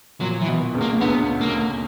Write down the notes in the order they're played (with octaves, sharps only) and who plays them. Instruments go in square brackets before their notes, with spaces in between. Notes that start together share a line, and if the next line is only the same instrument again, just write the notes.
[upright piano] A#2 [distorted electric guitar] F#3
[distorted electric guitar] E3
[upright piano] B2
C#2 C#3
[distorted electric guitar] A#3
[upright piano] D2 D3 [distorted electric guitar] B3
[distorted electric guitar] A#3